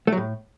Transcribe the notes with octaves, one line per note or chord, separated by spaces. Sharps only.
A3
F#3
A2